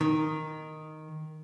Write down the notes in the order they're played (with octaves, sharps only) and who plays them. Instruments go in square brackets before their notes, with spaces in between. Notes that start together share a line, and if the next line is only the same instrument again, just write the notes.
[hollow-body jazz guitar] D#3